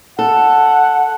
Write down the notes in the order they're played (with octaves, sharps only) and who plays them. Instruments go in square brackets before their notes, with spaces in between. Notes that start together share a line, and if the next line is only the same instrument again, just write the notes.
[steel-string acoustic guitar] A4 [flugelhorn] F#5